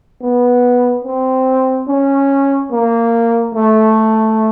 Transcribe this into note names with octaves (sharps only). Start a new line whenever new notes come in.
B3
C4
C#4
A#3
A3